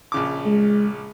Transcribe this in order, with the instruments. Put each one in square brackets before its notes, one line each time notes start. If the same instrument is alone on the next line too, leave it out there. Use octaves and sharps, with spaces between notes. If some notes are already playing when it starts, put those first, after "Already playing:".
[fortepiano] A#1 C#3 D6
[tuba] G#3